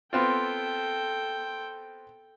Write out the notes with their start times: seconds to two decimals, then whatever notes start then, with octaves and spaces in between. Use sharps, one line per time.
0.13 B3 C4 F4 A4 G5